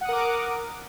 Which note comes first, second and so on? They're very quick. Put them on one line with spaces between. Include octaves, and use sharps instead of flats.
F#5 D#6 A#4 D6